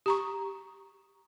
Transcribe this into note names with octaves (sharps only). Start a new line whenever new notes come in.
G4 A#5 C#6